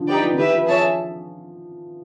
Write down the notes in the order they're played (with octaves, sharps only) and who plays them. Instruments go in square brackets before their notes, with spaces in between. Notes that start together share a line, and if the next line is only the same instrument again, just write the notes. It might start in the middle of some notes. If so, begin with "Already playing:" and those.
Already playing: [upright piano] D3 F3
[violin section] D#4 G4 B4 D5 G5
[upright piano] F3
D#3
[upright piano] E3 [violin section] G4 B4 E5
[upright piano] F3
[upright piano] F3 [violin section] G#4 C#5 E5 A5